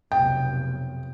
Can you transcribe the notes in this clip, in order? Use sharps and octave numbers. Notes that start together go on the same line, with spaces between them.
F1 B1 G5